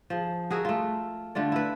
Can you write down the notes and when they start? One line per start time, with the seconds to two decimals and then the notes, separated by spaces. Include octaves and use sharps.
0.10 F3 G#4
0.50 F#4 G#4 A#4 E5
0.65 A3 F4
1.35 D3 A3 F4 D5
1.52 E4 B4